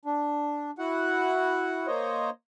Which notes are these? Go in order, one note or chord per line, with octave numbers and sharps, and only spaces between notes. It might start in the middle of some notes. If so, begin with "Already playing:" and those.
D4
E4 F#4 F#5
A#3 C5 C#5 D#5